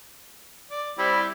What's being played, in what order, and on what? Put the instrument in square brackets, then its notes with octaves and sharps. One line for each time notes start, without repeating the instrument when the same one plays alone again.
[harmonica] D5
[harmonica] G3 C4 [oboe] E4